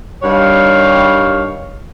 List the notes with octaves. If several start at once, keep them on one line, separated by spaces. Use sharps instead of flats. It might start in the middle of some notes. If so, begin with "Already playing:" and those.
G2 D#3 G3 C#5 F5